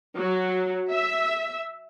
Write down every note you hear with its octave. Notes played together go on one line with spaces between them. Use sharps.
F#3
E5